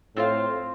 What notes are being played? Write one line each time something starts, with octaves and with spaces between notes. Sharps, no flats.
A2 C4 F4 C5 F5